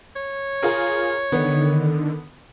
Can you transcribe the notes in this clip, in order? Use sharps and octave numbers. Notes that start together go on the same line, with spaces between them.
C#5
F4 G#4 A#4
D3 D#3 B3